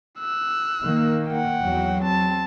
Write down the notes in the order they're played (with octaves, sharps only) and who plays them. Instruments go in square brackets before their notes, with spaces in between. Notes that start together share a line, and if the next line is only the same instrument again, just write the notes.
[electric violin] E6 F#6
[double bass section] D#3 A#3
[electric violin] F#5 G5
[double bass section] E2 F#3
[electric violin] C4 A5